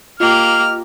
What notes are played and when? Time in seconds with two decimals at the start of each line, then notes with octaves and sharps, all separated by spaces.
0.20 A#3 F4 G4 D#5 F6